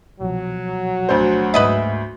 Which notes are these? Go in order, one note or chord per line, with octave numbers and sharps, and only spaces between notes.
C2 B2 F3 F#3
D2 C5
G#2 A#3 B4 D#5 E5